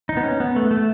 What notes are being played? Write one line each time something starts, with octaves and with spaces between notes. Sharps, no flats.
D#4
B3
C#4
B3
A3
A3